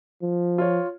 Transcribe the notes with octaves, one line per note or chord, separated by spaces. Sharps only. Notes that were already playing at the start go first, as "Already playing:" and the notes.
F3
F4 C#5